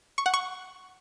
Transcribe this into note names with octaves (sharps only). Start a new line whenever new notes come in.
C#6
F#5
C#6